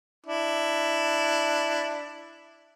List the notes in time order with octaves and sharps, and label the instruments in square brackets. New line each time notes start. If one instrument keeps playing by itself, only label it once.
[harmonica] D4 E4